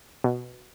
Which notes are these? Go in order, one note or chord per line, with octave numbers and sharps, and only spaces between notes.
B2